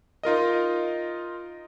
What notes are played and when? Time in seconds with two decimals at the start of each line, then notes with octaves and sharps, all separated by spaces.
0.23 D#4 F4 A#4 D#5